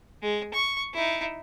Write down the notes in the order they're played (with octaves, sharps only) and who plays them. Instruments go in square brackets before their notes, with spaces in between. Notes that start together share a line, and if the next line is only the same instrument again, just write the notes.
[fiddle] G#3
C#6
D#4 E4